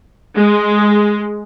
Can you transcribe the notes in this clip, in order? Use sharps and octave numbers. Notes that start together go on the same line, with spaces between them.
G#3